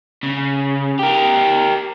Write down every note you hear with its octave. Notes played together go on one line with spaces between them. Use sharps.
C#3
G4 A#4